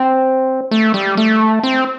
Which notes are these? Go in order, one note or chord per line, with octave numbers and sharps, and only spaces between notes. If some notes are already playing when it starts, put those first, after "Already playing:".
Already playing: C4
A3
G3
A3
C4